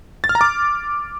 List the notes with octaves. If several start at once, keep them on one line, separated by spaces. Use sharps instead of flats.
A6
F6
A#5
D6